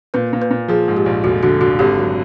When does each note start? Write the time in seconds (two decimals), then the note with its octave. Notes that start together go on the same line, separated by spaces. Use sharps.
0.14 A#2 B4
0.33 A#2
0.42 B4
0.51 A#2
0.68 F3 G#4
0.88 G#2
0.96 G4
1.06 A#1
1.24 F1 F#4
1.42 D3 F#4
1.61 D3 F#4
1.79 G#1 G4
1.98 F#3